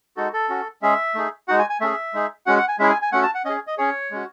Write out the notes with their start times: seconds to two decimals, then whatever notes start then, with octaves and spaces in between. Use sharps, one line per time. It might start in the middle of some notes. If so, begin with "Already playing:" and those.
0.17 G#3 D#4 F#4 A4
0.33 A4
0.49 C#4 F#4
0.82 G#3 C#4 G#4 E5
1.15 A3 D#4 G#4
1.48 G#3 D#4 F#4 F#5
1.59 G#5
1.70 G#5
1.81 A3 C#4 G#4 E5
2.14 G#3 D#4 G#4
2.46 G#3 C#4 F#4 F#5
2.58 F#5
2.68 G#5
2.79 G#3 C#4 E4 G#4 E5
2.90 G#5
3.02 G#5
3.12 A3 C#4 F#4 F#5
3.23 A5
3.35 F#5
3.45 C#4 D#5
3.49 G#4
3.67 D#5
3.78 C#4 G#4 C#5
4.11 G#3 C#4 F#4